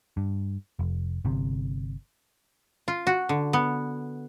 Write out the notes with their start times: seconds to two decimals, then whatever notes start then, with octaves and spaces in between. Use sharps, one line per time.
0.17 G2
0.79 F1
1.25 G1 C3
2.88 F4
3.07 F#4
3.29 D3
3.53 B3